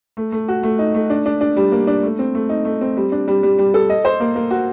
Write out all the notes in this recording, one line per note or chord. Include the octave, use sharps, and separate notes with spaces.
A3
A3
F#4
A3
D#4
A3
D4
D4
D4
G3
A#3
D4
A3
C4
A3
D#4
A3
C4
G3
D4
G3
G3
G3
A4
D#5
C5
A#3
A#3
F#4